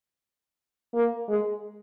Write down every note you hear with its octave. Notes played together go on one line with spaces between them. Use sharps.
A#3
G#3